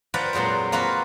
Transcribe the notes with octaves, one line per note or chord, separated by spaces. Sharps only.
F3 A#4 B4 D5 F#5 G5
F2 A#2 F#3 G#3 C5
A#3 C4 F4 F#4 B4